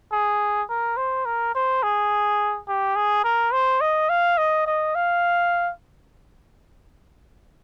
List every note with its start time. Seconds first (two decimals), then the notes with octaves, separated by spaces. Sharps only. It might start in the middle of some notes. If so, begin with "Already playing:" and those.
0.12 G#4
0.69 A#4
0.97 C5
1.25 A#4
1.55 C5
1.83 G#4
2.68 G4
2.96 G#4
3.24 A#4
3.53 C5
3.81 D#5
4.09 F5
4.38 D#5
4.66 D#5
4.95 F5